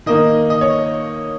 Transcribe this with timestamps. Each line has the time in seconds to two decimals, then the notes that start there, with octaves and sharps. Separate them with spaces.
0.06 D#3 A#3 D#4 D#5
0.50 D#5
0.61 C#5